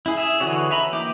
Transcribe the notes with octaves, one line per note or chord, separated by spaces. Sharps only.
E4 G#4
G#4 E5
D3 E3 F#4 G#4 C#5
D#4 E5 A#5 B5
E3 A#3 G5 D6